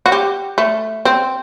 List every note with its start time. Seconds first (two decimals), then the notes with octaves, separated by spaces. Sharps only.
0.06 F#4
0.12 G4
0.58 A3
1.05 C4